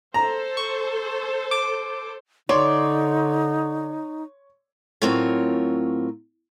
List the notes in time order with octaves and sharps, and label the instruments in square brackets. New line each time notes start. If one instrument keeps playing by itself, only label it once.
[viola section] A4 C5 [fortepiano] A#5
[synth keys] C#6
D6
[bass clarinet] D3 [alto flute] D#4 [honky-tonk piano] C#5 C6 [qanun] D5
[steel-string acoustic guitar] A2 F#3 C4 F4 A#4 C#5